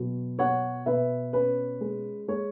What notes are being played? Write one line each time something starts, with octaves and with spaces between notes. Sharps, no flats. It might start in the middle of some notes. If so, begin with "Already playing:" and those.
Already playing: B2 F#3
B2 C#5 F#5
B2 B4 E5
C#4 B4
G#3
G#3 C#5